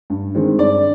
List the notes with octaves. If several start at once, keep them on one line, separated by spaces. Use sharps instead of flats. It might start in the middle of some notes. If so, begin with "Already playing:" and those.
G2
D#3 G#3 C4
G2 D5